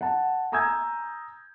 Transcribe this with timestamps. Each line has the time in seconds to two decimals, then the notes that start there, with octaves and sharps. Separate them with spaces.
0.01 F#5 A5
0.52 G#5 A#5 D#6 E6 G6 G#6